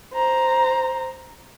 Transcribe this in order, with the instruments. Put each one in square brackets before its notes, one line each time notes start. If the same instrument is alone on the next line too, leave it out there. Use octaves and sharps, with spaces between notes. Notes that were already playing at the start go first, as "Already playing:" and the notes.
[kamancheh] C5 A#5